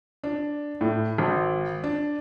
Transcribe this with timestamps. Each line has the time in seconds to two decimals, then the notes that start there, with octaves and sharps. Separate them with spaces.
0.23 D4
0.81 A2
1.18 G#1
1.84 D4